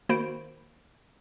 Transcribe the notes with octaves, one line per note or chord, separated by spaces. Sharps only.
D#3 A#3 F#4 C5 B5 D7